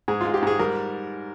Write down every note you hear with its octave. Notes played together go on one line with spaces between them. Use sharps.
G#2 G#4
G#3 F4
G4
G#2 G#4
G3 A#4